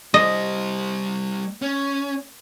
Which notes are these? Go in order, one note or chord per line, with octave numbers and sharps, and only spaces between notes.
G3 C5 D#5
C#4